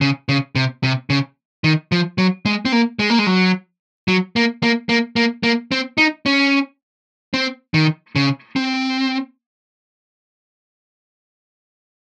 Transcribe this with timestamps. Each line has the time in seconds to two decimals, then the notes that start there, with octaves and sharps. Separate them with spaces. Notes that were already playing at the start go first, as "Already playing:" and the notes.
0.01 C#3
0.29 C#3
0.56 C3
0.84 C3
1.10 C#3
1.64 D#3
1.92 F3
2.18 F#3
2.46 G#3
2.65 C4
2.72 A#3
2.99 G#3
3.10 A#3
3.19 G#3
3.27 F#3
4.08 F#3
4.36 A#3
4.63 A#3
4.89 A#3
5.16 A#3
5.43 A#3
5.72 C4
5.98 D#4
6.26 C#4
7.34 C4
7.74 D#3
8.16 C#3
8.56 C4